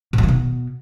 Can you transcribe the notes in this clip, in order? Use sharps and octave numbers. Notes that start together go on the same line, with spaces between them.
A2
F#3
D#3
B2